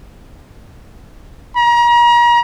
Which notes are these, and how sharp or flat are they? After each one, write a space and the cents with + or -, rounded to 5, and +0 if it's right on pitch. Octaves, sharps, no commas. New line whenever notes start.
A#5 +35